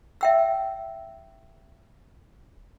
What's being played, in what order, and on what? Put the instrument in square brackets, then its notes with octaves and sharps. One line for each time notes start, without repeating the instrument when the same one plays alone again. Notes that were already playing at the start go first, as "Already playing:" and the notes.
[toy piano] E5 G5 E6